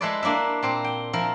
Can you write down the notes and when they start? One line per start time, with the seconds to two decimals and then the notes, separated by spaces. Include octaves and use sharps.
0.01 G#3 E4 A4 B4 C5 D5
0.23 A#3 D4 E4 E5
0.63 A#2 C4 C5
0.84 G5
1.13 F3 E4 A#4